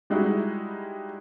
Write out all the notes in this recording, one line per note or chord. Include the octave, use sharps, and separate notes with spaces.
G3 G#3 D#4 E4 F#4